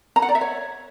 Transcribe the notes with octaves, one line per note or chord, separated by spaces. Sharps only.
A#5
F#5
D5
E5
C#5